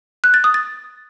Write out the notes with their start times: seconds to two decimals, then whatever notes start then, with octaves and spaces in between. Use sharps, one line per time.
0.24 F#6
0.34 A6
0.44 D#6
0.54 A6